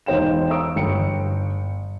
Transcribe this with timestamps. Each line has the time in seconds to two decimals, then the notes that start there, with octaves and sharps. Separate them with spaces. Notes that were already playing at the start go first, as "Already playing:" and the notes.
0.06 E1 D#4 C5 G5 E7
0.49 A#5 C#6 D#6 E6 D7
0.76 G1 G5 C#7